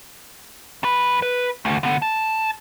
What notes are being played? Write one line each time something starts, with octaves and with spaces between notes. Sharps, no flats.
E2 B4
B4
D2 A3
D3 B3
A5